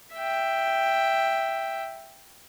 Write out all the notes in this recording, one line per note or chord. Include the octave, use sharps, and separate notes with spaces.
E5 G5